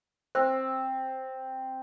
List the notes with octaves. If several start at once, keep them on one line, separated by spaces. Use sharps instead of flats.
C4 C5